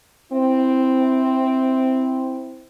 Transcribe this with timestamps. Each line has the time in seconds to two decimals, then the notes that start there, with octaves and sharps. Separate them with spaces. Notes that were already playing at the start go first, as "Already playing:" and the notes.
0.33 C4 E4